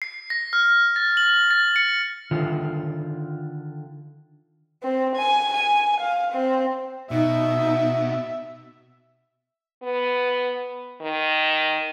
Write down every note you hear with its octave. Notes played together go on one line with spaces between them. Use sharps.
C7
A#6
F6
A6
F#7
A6
C#7
D3 D#3 F4
C4
G#5
G#5
F5
C4
B2 D#4 E5
B3
D#3